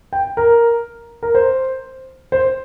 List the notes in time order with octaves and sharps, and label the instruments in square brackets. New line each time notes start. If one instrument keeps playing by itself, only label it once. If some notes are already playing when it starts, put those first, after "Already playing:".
[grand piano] G5
A#4
A#4
C5
C5